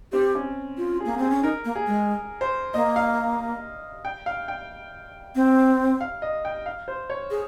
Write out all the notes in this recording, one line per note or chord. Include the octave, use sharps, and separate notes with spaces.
C4 G4
C#4
F4
A#3 G#4
C4 G#4
C#4
D#4 A#4
A#3
G#4
G#3
C5
A#3 D#5
F5
G5
F5
G5
C4
F5
D#5
G5
F5
C5
C#5
G#4